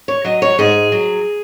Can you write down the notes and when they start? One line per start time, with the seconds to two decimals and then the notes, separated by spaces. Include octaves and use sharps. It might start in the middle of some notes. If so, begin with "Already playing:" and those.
0.08 C#5
0.24 F#3 D#5
0.42 C#5
0.59 G#2 G#4
0.92 F#3